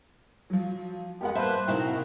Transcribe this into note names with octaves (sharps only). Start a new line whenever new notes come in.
F3 F#3
F2 G#3 B3 G4 A#4 F#5
G2 A#3 B4 C5 E5 A5 F#6
C3 D#4 E4 F#4 A#4 F5 G5